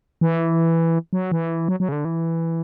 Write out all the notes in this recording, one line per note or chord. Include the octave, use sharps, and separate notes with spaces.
E3
F#3
E3
F#3
F#3
C#3
D3
E3